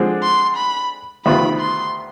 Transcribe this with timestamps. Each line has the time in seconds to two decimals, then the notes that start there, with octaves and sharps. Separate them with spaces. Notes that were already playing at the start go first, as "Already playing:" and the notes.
Already playing: D3 F3 G#3 C4
0.23 C6
0.57 B5
1.25 D2 C3 D#3 B3 F4 B5
1.60 C6